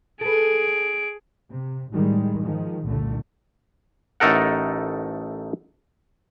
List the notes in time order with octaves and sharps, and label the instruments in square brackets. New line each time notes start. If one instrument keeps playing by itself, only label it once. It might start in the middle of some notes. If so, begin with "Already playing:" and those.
[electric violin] G#4 D7 [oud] A4 B4
[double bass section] C3
A2 D#3 G3 G#3
G#2 D#3 F3 G#3
F#1 C2 A#2 D3 A3
[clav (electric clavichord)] A1 A3 D#4 A4 A#4 F#5